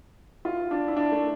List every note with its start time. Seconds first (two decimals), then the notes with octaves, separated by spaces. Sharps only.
0.45 F4
0.71 D4
0.88 E4
0.97 D4
1.12 A3